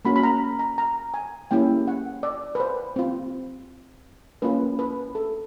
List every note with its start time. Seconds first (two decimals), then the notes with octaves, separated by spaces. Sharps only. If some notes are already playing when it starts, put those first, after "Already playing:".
0.05 A#3 C#4 F#4 B5
0.16 B5
0.23 A#5
0.59 A#5
0.78 A#5
1.14 G#5
1.51 A#3 C#4 E4 G4 G5
1.88 F#5
2.23 D5
2.55 B4
2.60 C5
2.96 C4 F4
4.42 A#3 C#4 F4 B4
4.79 B4
5.15 A4